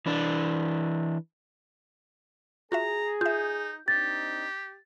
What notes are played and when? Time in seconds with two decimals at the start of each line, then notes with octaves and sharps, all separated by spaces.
0.06 E3 D4
2.72 F4 F#4 G#4 E5 A#5
3.21 D#4 F4 E5 G6
3.88 C4 D4 D#4 G4 A6